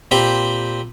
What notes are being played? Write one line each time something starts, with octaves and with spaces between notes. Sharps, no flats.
A#2 C4 G4 C5 B5 C6